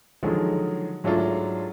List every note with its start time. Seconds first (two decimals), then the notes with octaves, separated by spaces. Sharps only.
0.23 D3 D#3 F3 F#3 G#3
1.04 G#2 F#3 A3 D4 F4